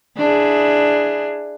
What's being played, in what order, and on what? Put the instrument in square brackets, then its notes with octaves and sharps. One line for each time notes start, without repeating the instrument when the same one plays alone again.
[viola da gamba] D4 E4 G#4